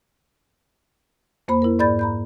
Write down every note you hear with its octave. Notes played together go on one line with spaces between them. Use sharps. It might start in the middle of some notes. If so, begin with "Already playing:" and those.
F2 A#3 C5 B5
E4 A#4
G#2 D5 B5 G6 A6
A#5 B5 G6